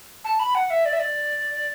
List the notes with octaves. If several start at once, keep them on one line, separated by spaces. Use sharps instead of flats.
A5
B5
F#5
E5
D5
E5
D5